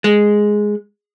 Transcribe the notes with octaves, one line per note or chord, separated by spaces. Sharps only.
G#3